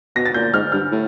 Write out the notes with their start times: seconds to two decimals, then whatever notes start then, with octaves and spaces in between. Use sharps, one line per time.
0.16 B2 A#6
0.25 A6
0.34 A#2 G6
0.54 G#2 F6
0.72 G2 F6
0.91 A2